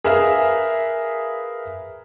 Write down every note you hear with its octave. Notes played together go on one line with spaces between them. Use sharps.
G#4 A#4 B4 E5 F5